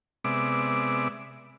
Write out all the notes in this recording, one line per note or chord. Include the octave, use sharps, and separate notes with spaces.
C3 G#3 B3 D5 E5 D6